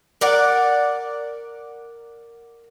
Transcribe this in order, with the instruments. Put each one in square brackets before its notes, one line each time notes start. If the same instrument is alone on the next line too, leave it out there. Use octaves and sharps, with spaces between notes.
[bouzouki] A#4 D5 F#5